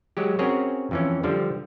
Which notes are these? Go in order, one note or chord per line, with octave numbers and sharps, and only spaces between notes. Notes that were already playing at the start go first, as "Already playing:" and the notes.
F#3 G#3 G4
C4 C#4 F#4 G#4 A#4 C#5
F2 E3 C#4
D3 F3 G3